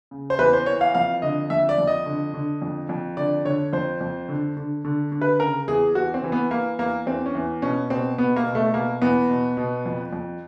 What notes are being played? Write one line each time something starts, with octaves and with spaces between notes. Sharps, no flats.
C#3
C5
E2 B4
C5
E3 C#5
F5
F2 F5
D3 D#5
F2 E5
D5
F2
D#5
D3
D3
F2
F2
D3 D5
D3 C#5
F2 C5
F2
D3
D3
D3
D3
B4
C#3 A#4
E2 G#4
E2 F#4
C4
E3
B3
E3 A#3
E2 A#3
E2 C4
C#4
E2
B2 C#4
B2 C4
B2 B3
A#3
B2
A3
B2 A#3
E2 B3
B2
B2
F2
F2